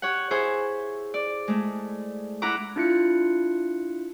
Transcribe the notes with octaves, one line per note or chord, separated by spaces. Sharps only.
G4 C#5 F#5
E4 G#4 C5 C#5 E5
D5
G#3 A3
E4 E5 F#5 A#5 D6
D4 E4 F4 F#6 C#7